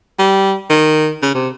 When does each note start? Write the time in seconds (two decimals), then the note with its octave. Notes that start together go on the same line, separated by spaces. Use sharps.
0.19 G3
0.70 D#3
1.22 C#3
1.34 C3